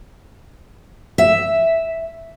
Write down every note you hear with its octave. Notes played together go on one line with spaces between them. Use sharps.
E5